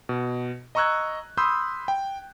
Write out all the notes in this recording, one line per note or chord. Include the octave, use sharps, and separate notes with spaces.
B2
D#5 A#5 C#6 E6 F#6 G#6
B5 C6 D#6 E6 G6
G5